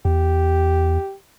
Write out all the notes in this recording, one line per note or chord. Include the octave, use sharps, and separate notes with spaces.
E2 G4